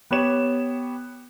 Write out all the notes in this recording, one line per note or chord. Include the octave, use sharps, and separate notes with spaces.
B3 G4 C#5 E7